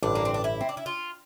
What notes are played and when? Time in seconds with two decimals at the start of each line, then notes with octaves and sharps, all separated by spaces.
0.03 A1 G2 D3 D4
0.15 A#3
0.25 C4
0.34 D4
0.44 E4
0.61 C4
0.69 D4
0.77 E4
0.86 F4